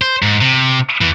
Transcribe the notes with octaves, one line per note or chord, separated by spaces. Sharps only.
C5
G#2
C3
E2 E3